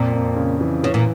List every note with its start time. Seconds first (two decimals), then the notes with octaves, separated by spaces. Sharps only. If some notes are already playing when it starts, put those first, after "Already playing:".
Already playing: F2 A#2 D5
0.13 F2
0.36 C#3
0.61 E3
0.83 C#3 E3
0.94 A#2